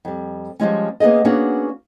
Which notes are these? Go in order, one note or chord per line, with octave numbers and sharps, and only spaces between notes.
F2 G3
F3 G3 G#3 C#4
A#3 B3 C#4 G#4 D#5
A#3 B3 C#4 D4 F#4 G#4